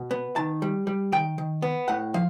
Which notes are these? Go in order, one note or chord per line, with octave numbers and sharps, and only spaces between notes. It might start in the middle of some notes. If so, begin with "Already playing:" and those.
Already playing: B2
B3
D#3 A5
G3
G3
D#3 G5
D#3
B3
A2 F#5
F3 F5